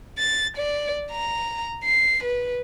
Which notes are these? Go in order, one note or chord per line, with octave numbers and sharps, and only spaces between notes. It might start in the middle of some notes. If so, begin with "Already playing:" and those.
A6
D5
A#5
C7
B4